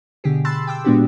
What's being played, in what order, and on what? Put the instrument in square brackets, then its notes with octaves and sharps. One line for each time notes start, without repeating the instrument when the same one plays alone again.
[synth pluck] B2 D3 G4 G#4
A5 B5 C6 E6 F#6 A6
G5 D6 E6
A#2 G#3 B3 D4 F#4 G4